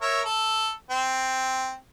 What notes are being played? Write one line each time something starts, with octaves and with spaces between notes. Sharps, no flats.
A#4 C#5 E5
A4
C4